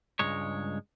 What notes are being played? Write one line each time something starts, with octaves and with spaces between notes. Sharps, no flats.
C#2 G2 G#3 C#5